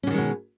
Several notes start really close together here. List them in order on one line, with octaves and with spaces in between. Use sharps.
C#4 D3 D#3 G#3 B2